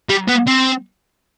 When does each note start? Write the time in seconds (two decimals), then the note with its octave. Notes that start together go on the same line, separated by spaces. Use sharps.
0.09 G3
0.28 B3
0.47 C4